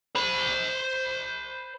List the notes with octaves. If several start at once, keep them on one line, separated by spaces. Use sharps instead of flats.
C5 B5